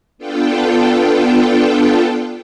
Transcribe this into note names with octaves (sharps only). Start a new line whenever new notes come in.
B3 D4 F4 A4 G5